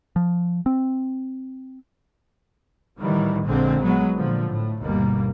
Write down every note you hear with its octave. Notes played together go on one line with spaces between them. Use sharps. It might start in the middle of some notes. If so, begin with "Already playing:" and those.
F3
C4
A2 D#3 E3 F#3 G3
A#1 A#2 D3 G#3 C4
F#3 G#3 B3
A#2 D3 F3
A2
G1 D#2 B2 G3 A#3